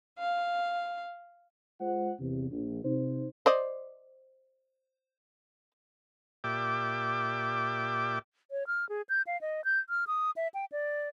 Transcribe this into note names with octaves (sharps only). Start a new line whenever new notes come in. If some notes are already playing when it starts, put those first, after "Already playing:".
F5
G#3 F4 C5 F#5
E2 C3
A#1
C3 D#4 C5
C5 D5 D#5
A#2 G4 D5 E5 G5 D6
C#5
F6
G#4
G6
F5
D#5
G6
F6
D#6
E5
G5
D5